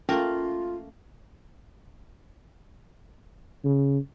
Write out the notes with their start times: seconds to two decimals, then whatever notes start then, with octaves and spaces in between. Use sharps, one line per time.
0.09 A3 A#3 C#4 F4 A#4
3.65 C#3